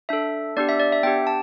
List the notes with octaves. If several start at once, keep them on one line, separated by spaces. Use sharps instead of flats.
D4 A4 E5
B3 D4 G4 D5
E5
D5
E5
B3 D4 G4 G5
A5